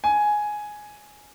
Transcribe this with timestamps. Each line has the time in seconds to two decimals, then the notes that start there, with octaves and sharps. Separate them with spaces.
0.04 G#5